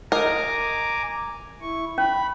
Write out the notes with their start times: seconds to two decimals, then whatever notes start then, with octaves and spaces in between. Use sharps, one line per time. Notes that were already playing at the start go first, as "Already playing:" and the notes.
0.12 A#4 D#5 G#5 A#5 D6
1.61 E4 C#6
1.98 C#4 B5